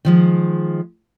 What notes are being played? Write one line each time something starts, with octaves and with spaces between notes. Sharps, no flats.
D#3 F3 G#3